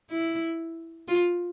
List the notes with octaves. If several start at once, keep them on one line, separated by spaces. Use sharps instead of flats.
E4
F4